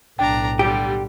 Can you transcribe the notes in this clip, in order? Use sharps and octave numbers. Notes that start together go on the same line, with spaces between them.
B1 A2 D4 G5 A#5
D3 G3 G4